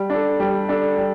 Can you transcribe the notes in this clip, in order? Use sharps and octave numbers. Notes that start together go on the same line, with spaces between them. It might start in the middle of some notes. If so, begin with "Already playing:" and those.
Already playing: G3
D4
A4
G3
D4 A4
G3